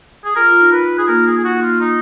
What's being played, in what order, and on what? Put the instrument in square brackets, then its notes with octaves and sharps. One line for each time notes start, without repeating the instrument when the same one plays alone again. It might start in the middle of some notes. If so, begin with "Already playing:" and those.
[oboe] G#4
[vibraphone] F4 [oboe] A#4
[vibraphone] F4
D#4
[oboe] B4
G#4
[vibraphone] A#3 [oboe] A#4
[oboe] G#4
G#4
F#4
F4
D#4